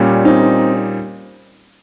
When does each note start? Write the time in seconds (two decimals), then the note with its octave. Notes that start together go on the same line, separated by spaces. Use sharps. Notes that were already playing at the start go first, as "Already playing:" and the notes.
Already playing: A#2 G3 C#4
0.25 C4 D#4